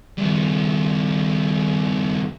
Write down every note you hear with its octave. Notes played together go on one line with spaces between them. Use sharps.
G2 D#3